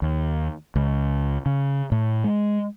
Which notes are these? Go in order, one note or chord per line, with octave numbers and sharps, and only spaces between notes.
D#2
C#2
C#3
A2
G#3